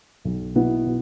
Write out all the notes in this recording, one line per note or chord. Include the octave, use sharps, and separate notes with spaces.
B1
B2 B3 E4
B2